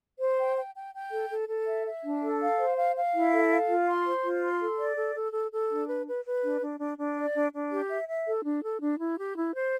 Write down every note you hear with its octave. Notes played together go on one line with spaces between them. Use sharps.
C5
G5
G5
G5
G5
A4
A4
A4
E5
E5
D4
A4
F5
C5
F5
F5
E4
A4
F5
F4
C6
C5
F4
C6
A4
D5
A4
A4
A4
A4
D4
B4
B4
B4
D4
D4
D4
D4
D5
D4
D4
G4
E5
E5
A4
D4
A4
D4
E4
G4
E4
C5